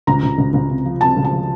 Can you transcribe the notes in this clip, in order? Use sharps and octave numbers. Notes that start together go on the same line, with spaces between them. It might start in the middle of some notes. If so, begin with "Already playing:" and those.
C#2 A#5
C#2
C#2
C#2
C3
F3
C3 A5
C#2
A5
F3